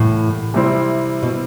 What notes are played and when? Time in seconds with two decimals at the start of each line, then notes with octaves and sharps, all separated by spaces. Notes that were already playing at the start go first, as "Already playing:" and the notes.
Already playing: C2 A2 C3 E3
0.54 C3 G3 C4 E4
1.22 B2